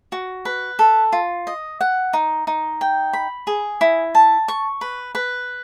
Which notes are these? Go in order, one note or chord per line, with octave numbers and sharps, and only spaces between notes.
F#4
B4
A4
F4
D#5
F#5
D#4
D#4
G5
B5
G#4
E4
A5
C#6
B4
B4